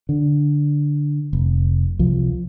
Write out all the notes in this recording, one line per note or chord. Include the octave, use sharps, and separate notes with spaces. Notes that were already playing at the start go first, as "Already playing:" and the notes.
D3
F1
C2 F3